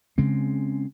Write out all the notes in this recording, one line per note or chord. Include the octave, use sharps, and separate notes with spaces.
C#3 G#3 C4